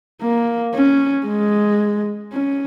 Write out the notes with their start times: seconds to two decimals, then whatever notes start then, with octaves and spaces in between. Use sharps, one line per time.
0.21 A#3
0.74 C#4
1.27 G#3
2.33 C#4